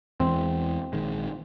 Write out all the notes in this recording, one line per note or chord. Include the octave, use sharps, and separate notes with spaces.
E2 E3 G#3 C4
A#1 D#3 G#3